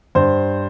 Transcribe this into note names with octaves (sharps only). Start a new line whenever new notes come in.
G2 C5